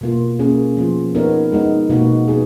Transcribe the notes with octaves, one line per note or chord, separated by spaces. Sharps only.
B2 A#3 F4
A#3 C#4 G#4
F3 B3 F4
B3 D#4 A#4 C#5
G#3 B3 D#4
B2 A#3 D#4 F#4
B3 D#4 G#4